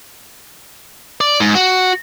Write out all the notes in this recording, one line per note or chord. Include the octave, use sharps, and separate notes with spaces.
D5
G#2
F#4